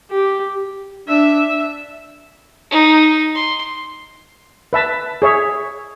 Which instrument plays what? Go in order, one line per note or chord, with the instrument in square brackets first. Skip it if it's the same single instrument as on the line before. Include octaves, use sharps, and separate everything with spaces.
[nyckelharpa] G4
[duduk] D4 [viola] E5
[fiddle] D#4
C6
[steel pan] B4 E5 A5
G#4 C#5 E5